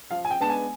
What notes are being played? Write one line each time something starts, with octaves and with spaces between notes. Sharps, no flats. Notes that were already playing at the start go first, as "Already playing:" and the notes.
F3 F5
G#5
G5
G#3 B3 D4 A5
G#5